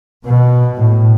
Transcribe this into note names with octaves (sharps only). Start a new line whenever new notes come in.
B2
A2